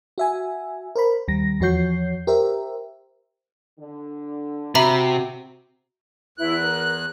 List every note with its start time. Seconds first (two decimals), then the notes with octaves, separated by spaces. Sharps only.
0.18 F#4 E5 G#5
0.96 A#4 C5 B5
1.28 D#2 G3 A#6
1.60 E2 F3 F#4 C#5 G6 C7
2.27 G4 A#4 C5 E5
3.79 D3
4.75 C3 F#4 E5 A#5 B5
6.38 E2 E4 B4 F#6
6.58 A#4